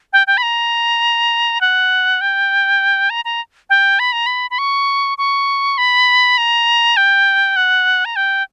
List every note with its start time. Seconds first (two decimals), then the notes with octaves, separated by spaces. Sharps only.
0.13 G5
0.27 G5
0.37 B5
0.43 A#5
1.61 F#5
2.21 G5
3.10 A#5
3.25 A#5
3.70 G5
3.99 B5
4.12 A#5
4.26 B5
4.51 B5
4.59 C#6
5.18 C#6
5.78 B5
6.38 A#5
6.97 G5
7.56 F#5
8.05 A#5
8.16 G5